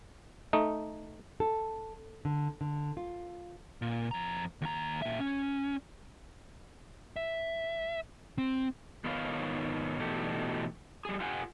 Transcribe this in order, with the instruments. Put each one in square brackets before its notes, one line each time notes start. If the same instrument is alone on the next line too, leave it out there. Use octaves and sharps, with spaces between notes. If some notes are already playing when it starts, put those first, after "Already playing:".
[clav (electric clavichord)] A3 D#4
[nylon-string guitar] A4
D3
D3
F4
[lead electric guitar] A#2
F2 A#5
D#2 A#5
A#2 E5
C#4
E5
C4
[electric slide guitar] G#2 D#3 B3 F4 C#5 F5
B2 D3 E3 A3 D#4 G4
G3 G#4
F4 G4 F#5 G#5